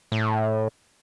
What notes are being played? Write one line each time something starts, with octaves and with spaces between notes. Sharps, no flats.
A2